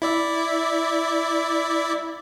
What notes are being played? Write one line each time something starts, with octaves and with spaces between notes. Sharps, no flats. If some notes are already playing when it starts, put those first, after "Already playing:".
E4 D5 E5